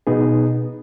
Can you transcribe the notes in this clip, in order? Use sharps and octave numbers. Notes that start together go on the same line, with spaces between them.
B2 B3 D#4 G#4